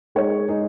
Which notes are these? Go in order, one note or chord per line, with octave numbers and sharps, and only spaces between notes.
G#3 D#4 C#5
G#3 D#4 G#4